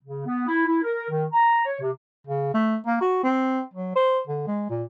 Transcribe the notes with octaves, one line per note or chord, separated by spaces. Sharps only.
C#3
B3
E4
E4
A#4
D#3
A#5
C#5
C3
C#3
A3
A#3
F#4
C4
F#3
C5
D3
G#3
A#2